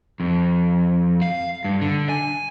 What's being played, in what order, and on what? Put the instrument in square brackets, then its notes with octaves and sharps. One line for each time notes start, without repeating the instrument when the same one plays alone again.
[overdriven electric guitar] F2
F5
G2
D3
G#5